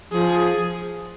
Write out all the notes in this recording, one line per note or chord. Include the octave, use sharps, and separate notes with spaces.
F3 G#4